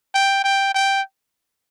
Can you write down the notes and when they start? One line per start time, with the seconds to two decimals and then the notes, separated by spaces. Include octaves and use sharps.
0.15 G5
0.44 G5
0.75 G5